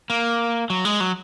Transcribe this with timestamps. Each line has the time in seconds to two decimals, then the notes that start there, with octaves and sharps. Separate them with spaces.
0.10 A#3
0.70 F#3
0.85 G#3
1.00 F#3